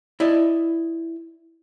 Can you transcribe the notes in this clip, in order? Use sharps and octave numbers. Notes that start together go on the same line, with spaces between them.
E4 D5 D#5